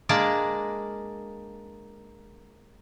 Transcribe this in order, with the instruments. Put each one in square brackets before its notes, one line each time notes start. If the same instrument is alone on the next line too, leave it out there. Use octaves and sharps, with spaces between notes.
[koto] G#3 A#3 D4 D5